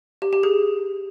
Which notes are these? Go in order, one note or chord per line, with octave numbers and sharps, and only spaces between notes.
G4
G4
G#4